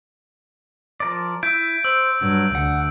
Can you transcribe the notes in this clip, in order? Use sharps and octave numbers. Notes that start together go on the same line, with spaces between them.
F3 A#4 D5
E4 E6 G6 D7
C5 E6
G2 F#3
D2 F#5